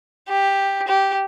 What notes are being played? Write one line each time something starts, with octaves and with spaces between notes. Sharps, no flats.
G4
G4